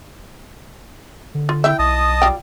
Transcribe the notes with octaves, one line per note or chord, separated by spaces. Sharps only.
D3
F4
E4 E5 G5
B1 D#5 A5 D#6
G3 F4 G5